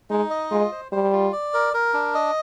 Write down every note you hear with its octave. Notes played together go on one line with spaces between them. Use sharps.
G#3 D#4
D#5
G#3 F4
C5
G3 C5
F4
D5
A#4
A#4
D4
D#5